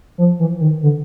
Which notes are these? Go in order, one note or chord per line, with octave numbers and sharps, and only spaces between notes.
F3
E3
D#3
D3